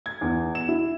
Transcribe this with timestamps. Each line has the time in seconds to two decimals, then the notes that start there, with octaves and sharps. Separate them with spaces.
0.06 G#6
0.21 E2
0.55 E7
0.68 E4